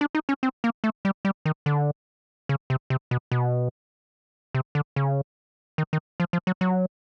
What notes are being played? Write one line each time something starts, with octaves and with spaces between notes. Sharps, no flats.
D4
D#4
C#4
C4
A#3
A3
G3
G3
D#3
D3
C#3
C3
C3
B2
B2
C3
D3
C#3
D#3
D#3
F3
F3
F#3
F#3